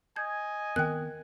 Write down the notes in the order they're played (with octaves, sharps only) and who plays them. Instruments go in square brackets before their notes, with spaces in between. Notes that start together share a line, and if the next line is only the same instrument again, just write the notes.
[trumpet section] D#5 G#5 [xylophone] G6 G#6
[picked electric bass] D#3 B3 C4 [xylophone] A#4 G5 [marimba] F#6